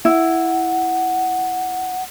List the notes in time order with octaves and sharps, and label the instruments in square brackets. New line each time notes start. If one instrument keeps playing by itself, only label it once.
[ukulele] E4 [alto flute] F#5